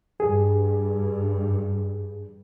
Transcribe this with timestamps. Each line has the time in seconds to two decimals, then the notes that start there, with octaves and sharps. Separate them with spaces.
0.20 G2 G#4